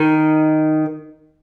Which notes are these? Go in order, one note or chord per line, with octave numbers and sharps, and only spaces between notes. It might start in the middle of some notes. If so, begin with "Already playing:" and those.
Already playing: D#3 D#4